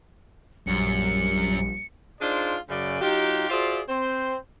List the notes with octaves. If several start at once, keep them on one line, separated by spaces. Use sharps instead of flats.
A#1 F#2 G3 C#7
D4 D#4 F4 G#4 C5 D5
F#2 C#3 D5
F#3 D#4 F4 G4
F4 F#4 G#4 C5 D5 E5
C4 C5